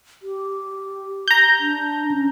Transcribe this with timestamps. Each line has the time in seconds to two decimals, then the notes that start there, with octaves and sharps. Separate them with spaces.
0.22 G4
1.28 A#5 G6
1.60 D4
2.11 C#4